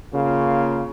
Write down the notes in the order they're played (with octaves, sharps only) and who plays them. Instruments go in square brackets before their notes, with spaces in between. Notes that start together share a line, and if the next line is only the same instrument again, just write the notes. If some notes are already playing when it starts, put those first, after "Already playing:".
[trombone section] C#3 A#3 F4